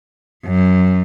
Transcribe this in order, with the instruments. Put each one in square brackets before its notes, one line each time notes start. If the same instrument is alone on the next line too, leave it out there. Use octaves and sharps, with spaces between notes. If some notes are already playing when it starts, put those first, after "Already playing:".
[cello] F#2